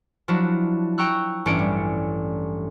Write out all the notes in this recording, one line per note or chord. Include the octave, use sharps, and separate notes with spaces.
F3 F#3 D4 E4 F#4
G5 A#5 C#6 E6 F#6
A1 G2 C#4 D4 C#7 D7
G3